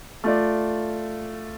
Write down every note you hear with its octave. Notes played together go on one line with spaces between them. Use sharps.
A3 F4 D5